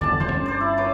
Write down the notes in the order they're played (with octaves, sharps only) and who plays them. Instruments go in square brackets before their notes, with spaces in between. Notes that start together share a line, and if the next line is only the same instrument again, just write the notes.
[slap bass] G1 E2 D3 [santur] D5 A5
[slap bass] D#1 E2 A2 [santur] C5
[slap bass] G1 C#4
[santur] C5 D5
E4
B4 C#5 D6